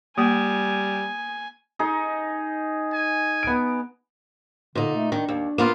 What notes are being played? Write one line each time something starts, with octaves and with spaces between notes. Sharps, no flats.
G3 A#3 G#5 D#6
D#4 G#4
G#5
B3 D7
A#2 D3 D#4
A3
D#3 D4
D#2
A#3 B3 F4